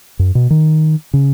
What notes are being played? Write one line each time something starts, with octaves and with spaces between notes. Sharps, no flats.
F#2
B2
D#3
C#3